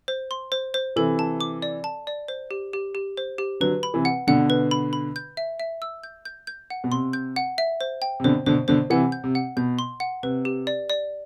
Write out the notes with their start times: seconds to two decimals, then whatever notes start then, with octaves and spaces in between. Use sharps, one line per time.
0.08 C5
0.31 C6
0.52 C5
0.74 C5
0.96 C3 E3 A4
1.19 A5
1.41 D6
1.62 D5
1.84 A5
2.07 D5
2.28 C5
2.51 G4
2.73 G4
2.95 G4
3.17 C5
3.38 G4
3.60 D3 F#3 B4
3.83 B5
3.94 C3 E3
4.05 F#5
4.27 B2 D3 F#5
4.50 B4
4.71 B5
4.93 B5
5.16 G6
5.37 E5
5.60 E5
5.82 E6
6.04 G6
6.25 G6
6.47 G6
6.70 F#5
6.84 B2
6.92 C3 C6
7.13 G6
7.36 F#5
7.58 E5
7.81 C5
8.02 G5
8.20 C3
8.24 B2 D3 C5
8.46 B2 D3 C5
8.68 B2 D3 C5
8.90 C3 E3 F#5
9.12 G6
9.24 C3
9.35 F#5
9.57 B2 G6
9.79 C6
10.00 F#5
10.23 C3 B4
10.45 G4
10.67 D5
10.89 D5